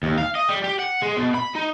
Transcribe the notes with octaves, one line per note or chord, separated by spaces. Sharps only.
D#2
F5
D#5
G3
G4
F#5
G#3
B2
B5
D#4